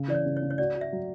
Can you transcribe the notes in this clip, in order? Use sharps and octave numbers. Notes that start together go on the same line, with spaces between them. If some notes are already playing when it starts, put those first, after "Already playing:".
Already playing: C#3
E3 D5
C#5
C#3
C#5
C#3
C#5
F#4 D5
F#4
E5
F#3